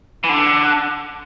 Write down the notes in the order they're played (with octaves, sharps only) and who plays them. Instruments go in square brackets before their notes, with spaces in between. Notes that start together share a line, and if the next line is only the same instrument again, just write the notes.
[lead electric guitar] E3
D3